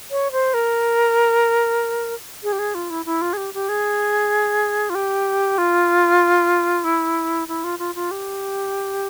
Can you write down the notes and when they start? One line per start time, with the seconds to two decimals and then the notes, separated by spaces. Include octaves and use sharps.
0.11 C#5
0.32 C5
0.54 A#4
2.43 G#4
2.52 G4
2.59 G#4
2.75 F4
2.90 E4
3.06 E4
3.22 F4
3.33 G#4
3.37 G4
3.54 G4
3.69 G#4
4.90 F4
4.95 G4
5.58 F4
6.84 E4
7.48 E4
7.64 F4
7.79 F4
7.95 F4
8.11 G4